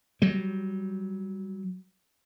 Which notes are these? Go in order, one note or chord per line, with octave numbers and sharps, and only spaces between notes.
F#3 G3